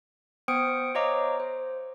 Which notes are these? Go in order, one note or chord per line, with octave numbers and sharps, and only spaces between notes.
B3 C5 G5 D#6 C#7 D7
C5 C#5 D#5 F5 A#5 D6
C5